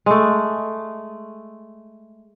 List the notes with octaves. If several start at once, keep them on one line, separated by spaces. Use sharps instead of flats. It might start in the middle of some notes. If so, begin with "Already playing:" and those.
G#3 A3